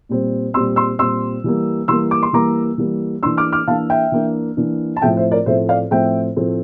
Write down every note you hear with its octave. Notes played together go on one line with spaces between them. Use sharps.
A#2 G3 C4
A#2 G3 C4 C6 E6
C6 E6
A#2 G3 C4 C6 E6
E3 G3 A#3
E3 G3 A#3 C6 E6
D6
C6
E3 G3 A#3 A#5 D6
E3 G3 A#3
E3 A#3 D4 C6 E6
D6 F6
D6 F6
E3 A#3 D4 F5 A5
E5 G5
E3 A#3 D4
E3 A#3 D4
A5
A2 F3 A3 C4 E5 G5
C5 E5
A#4 D5
A2 F3 A3 C4 C5 E5
D5 F5
A2 F3 A3 C4 E5 G5
A2 F3 A3 C4